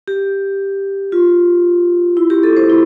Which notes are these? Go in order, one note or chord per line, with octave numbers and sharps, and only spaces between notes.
G4
F4
E4
G4
A4
C5
E4